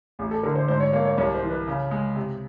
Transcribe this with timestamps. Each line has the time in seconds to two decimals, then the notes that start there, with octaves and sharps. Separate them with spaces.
0.19 A1 G#4
0.31 A4
0.43 D3 A#4
0.56 C5
0.68 G#2 C5
0.80 C#5
0.93 A#3 C#5
1.05 C#5
1.17 C2 C#5
1.35 C5
1.42 E3
1.50 B4
1.68 C#3
1.91 G#3
2.16 C3